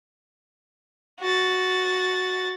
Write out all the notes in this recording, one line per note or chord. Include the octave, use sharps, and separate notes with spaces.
F#4 A6